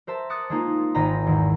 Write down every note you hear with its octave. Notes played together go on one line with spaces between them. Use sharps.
A#4 C5 E5 A5
D6 D#6 F#6 A6 C#7
G#3 A#3 D#4 F4
G#1 C5 D#5 A#5 B5
E2 G#2 D#3